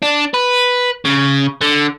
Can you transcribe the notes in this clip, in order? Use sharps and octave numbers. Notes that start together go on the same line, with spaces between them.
D4
B4
C#3
D3